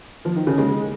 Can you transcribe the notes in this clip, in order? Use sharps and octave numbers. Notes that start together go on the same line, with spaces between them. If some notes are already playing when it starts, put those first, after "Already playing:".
F3
D#3
C#3
G#3